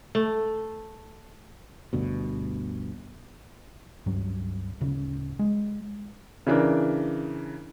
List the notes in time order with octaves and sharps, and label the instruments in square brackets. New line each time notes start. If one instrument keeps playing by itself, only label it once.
[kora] A3
[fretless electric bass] G1 D2 G2 B2
[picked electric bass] C#2 G2 F#3
D1 C#3
G#3
[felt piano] C#3 E3 D4 A#4